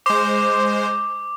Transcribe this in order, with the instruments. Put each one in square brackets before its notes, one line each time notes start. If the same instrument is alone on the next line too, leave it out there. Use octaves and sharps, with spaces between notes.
[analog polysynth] G#3 C5 [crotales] D6